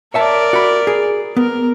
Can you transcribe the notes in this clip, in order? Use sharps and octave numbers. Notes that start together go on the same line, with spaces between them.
A#4 C#5 D5 E5 A5
F#4 B5
G#4
B3 A#4